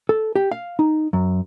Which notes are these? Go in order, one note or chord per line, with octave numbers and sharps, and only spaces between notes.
A4
G4
F5
D#4
F#2